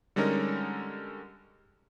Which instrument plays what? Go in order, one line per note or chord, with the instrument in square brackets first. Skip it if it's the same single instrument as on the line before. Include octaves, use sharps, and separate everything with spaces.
[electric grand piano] D3 G3 G#3 C#4 D#4 A#4